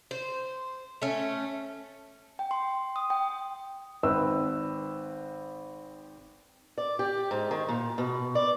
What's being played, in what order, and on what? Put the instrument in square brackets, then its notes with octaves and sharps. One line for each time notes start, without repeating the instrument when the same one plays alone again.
[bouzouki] C5
A3 C#4
[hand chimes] G5
C6
D#6
G5
[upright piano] G#1 C4 B4 E6
[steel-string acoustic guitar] D5
G4
G#2
D#3
A#2
B2
D5